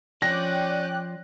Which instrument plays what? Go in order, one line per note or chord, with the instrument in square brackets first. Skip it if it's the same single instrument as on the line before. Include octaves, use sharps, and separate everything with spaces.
[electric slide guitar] F3 [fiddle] C#4 [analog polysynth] D5 G5 F#6 [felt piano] A#6